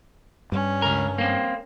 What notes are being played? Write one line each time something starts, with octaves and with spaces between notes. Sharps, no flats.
G2 G3 C#4
C#2 A#4
A#3 C4